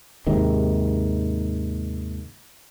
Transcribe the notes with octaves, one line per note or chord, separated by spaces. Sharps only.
D#2 G#2 C3 D#3